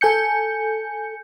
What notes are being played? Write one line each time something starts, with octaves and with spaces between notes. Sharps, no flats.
A4 G#5 G6 C#7